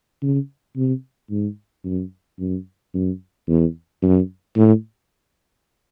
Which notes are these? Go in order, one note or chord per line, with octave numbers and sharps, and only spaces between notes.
C#3
C3
G#2
F#2
F#2
F#2
E2
F#2
A2